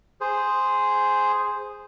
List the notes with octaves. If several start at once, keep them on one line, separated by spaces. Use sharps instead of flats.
G#4 C5